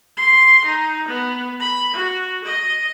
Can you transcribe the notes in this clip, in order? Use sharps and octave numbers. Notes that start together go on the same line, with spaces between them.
C6
D#4
B3
B5
F#4
D#5